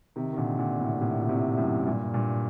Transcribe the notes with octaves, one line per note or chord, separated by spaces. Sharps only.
C3 D#3
D#3
A#2 D3
A#2 D3
A2 C3
A2 C3
A#2
A2 C3
F#2 A2
G2 A#2
G2 A#2